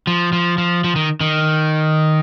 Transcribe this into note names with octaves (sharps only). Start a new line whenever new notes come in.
F3
F3
F3
F3
D#3
D#3